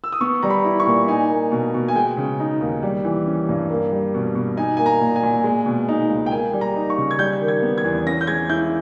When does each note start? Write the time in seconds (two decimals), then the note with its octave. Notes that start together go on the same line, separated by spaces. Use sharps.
0.04 E6
0.12 D#6
0.21 B3 C#6
0.43 G3 A#5
0.50 B5
0.65 E4
0.80 C#6
0.86 A#2
1.08 D#4 G#5
1.30 A#3
1.51 B2
1.74 B2
1.88 G#5
1.96 G#3 G5
2.17 C#3
2.40 D#4
2.61 D#2
2.83 G3
3.05 E3
3.26 C#4
3.49 G2
3.70 A#3
3.92 G3
4.14 B2
4.35 B2
4.57 D#4 G#5
4.77 A#3 G#5
4.86 A#5
5.01 A#2
5.16 G#5
5.23 A#2
5.44 G#3
5.66 B2
5.88 D#4
6.10 C#2
6.26 G5
6.31 A#3 G#5
6.53 G3
6.61 A#5
6.76 D#4
6.90 C#6
6.97 C#3
7.11 G#6
7.19 G3 G6
7.41 D#3
7.48 G#6
7.62 B3
7.78 G#6
7.84 E2
8.06 C#4 A#6
8.21 G6
8.27 G#3 G#6
8.49 E4 G6